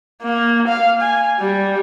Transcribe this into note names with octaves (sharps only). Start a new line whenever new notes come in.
A#3
F5
G#5
G3